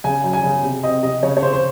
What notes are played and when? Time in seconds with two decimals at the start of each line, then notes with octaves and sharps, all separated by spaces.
0.04 C#3 G#5
0.24 F#2
0.33 G#5
0.44 C#3
0.63 C3
0.83 C4 D#5
1.02 C3 D#5
1.23 C#3 C#5
1.37 C#5
1.42 C#3 C5
1.53 C5